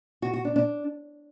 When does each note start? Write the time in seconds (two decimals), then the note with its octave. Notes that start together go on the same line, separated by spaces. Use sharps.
0.22 F#4
0.33 F#4
0.45 D4
0.56 D4